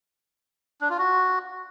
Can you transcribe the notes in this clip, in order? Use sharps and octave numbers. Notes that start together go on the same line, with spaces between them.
D4
F4
F#4